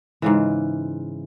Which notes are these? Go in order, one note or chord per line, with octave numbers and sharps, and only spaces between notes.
G#2 C#3 E3